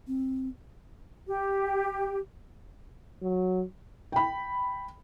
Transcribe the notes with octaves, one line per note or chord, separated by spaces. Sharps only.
C4
G4
F#3
G5 B5